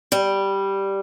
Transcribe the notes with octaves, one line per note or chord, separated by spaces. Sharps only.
G3